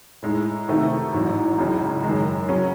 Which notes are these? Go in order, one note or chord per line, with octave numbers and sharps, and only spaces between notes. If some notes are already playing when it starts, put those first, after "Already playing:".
A2 G#3 D#4
C3 D#3 A3 D#4 F#4
A1 G#2 F#3
C#2 C#3 F#3
F#2 D#3 G#3
C#3 F#3 C#4